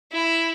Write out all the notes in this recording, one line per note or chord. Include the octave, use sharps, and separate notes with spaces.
E4